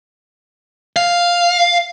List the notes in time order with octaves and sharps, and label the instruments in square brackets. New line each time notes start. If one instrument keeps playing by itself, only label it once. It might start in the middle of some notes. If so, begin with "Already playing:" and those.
[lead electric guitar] F5